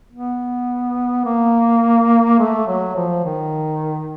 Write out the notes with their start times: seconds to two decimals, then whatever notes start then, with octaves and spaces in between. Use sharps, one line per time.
0.11 B3
1.25 A#3
2.39 A3
2.67 F#3
2.96 F3
3.24 D#3